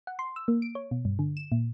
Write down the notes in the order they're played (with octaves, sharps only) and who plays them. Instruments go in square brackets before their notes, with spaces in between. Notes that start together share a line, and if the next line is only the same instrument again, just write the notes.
[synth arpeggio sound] F#5
C6
E6
A#3
D7
C#5
B2
G2
D3
E7
A#2